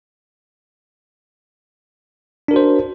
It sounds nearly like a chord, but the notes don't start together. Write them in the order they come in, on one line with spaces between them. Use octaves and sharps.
D4 A#4 F#4 C5